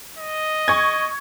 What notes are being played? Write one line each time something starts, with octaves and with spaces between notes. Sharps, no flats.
D#5
C#6 G#6